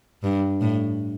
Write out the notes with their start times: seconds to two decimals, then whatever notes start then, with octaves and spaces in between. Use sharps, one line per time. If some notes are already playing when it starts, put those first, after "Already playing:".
0.23 G2
0.61 A2